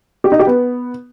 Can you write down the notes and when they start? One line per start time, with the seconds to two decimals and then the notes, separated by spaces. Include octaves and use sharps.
0.24 G4
0.32 D#4
0.39 G4
0.47 B3